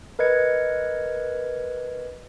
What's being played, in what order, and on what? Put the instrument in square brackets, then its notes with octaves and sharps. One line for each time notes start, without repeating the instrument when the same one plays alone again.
[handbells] A#4 B4 D#5 G#6 C#7